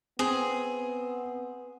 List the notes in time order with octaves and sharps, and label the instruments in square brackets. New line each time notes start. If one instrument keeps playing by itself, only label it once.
[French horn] B3 [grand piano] C4 [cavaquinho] G#4